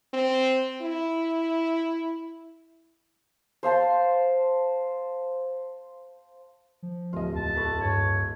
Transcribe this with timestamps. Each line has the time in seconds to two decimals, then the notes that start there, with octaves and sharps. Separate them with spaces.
0.14 C4
0.82 E4
3.63 C5 F5 A5 C6
6.83 F3
7.13 D1 F4 D#5
7.35 E2 A5
7.56 A3 B4
7.81 G2 C#5